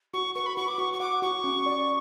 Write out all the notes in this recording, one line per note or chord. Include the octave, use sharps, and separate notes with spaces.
F#4 C#6
B4 C#6
B5
F#4 C#6
D6
F#4 C#6
C#6
F#5 D6
F#4 C#6
C#4
D5